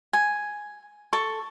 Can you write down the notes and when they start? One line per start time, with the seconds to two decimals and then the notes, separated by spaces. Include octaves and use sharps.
0.13 G#5
1.13 A4 C#6